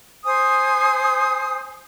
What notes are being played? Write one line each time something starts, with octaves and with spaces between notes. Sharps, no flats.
C5 G#5 D#6